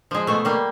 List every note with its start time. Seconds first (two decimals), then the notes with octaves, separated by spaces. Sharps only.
0.11 F3 G#3
0.27 B2 A3
0.45 G3 A#3